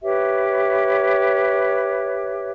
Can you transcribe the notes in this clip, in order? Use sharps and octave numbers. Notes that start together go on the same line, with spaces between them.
G4 B4 C#5 E5